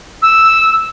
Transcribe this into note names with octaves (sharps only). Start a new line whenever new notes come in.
E6